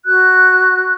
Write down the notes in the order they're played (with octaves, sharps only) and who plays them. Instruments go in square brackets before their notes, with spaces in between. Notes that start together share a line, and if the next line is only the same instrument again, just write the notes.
[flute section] F#4 F#6